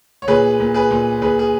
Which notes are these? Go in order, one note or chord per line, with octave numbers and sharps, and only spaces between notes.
C#5
A#2 G#4 B4
A#2
G#4 B4
A#2
A#2 G#4 B4
G#4